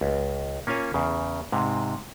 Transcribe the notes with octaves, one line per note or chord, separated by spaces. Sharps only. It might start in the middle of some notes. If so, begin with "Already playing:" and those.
C#2
A#3 C#4 F4 C#5 G#5
E2 C#3
G#2 C3